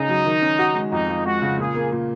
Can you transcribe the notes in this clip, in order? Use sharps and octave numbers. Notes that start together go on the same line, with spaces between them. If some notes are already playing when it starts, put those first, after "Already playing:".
Already playing: C#3 C#4 D#4 G#4
F#3
D#3
C#4
F#4
G#3
F2 D#4
F3
G#3 F#4
C#3
A#2 G#4
A#3
A#2